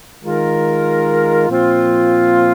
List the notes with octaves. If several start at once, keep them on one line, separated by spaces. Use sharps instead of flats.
D#3 G#3 F4 A#4
A#2 F3 C4 F4